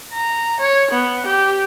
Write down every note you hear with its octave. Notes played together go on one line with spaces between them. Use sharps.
A#5
C#5
B3
G4